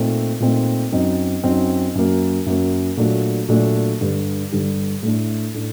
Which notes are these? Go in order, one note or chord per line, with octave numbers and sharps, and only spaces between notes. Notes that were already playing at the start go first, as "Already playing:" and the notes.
Already playing: A#2 A3 C4 D#4
A#2 A3 C4 D#4
F#2 F#3 C4 D#4
F#2 F#3 C4 D#4
F#2 F#3 A#3
F#2 F#3 A#3
A#2 F#3 A3 D4
A#2 F#3 A3 D4
G2 D3 G3
G2 D3 G3
A2 A3 D4
A2 A3 D4